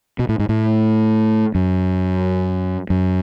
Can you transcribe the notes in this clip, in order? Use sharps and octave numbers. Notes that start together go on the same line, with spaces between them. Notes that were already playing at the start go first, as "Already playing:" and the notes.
B2
A2
G#2
A2
F#2
F#2